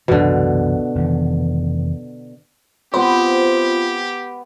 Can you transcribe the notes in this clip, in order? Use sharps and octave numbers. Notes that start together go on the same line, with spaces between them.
C2 F#2 B2 D3 E3
F1 D#3 E3
B3 C4 F4 G4 B4 C5